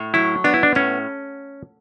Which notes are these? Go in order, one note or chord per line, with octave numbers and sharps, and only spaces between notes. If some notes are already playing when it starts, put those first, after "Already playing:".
Already playing: A2
F#3 E4
B3 D4
E4
D4
A2 C#4